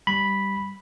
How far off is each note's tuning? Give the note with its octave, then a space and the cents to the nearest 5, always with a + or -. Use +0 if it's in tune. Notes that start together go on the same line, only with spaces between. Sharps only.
G3 +0 B5 -5